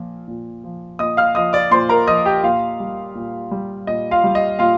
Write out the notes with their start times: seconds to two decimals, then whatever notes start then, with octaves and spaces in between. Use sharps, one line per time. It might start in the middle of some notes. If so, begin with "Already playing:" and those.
Already playing: A#2 F3
0.28 A#2
0.64 F3
0.99 A#2 D#5 D#6
1.17 F5 F6
1.35 F3 D#5 D#6
1.53 D5 D6
1.71 A#2 C5 C6
1.89 A#4 A#5
2.07 F3 D#5 D#6
2.25 G4 G5
2.43 A#2 F4 F5
2.80 G3
3.15 A#2
3.51 G3
3.87 A#2 D#5
4.11 F4 F5
4.24 G3
4.35 D#5
4.59 A#2 F4 F5